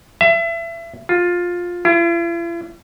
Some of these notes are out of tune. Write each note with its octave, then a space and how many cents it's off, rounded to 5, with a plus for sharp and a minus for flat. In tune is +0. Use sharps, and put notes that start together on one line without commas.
E5 +30
F4 +10
E4 +45